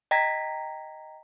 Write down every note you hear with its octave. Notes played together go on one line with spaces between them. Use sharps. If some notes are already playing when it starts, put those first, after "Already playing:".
D#5 G5 A#5 G#6 A#6 B6